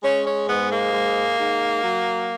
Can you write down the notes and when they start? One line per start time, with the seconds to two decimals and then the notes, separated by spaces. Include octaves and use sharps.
0.03 G#3 C#4
0.26 C#4
0.48 G#2 B3
0.72 A#3
0.93 G#3
1.39 G#2
1.84 F#3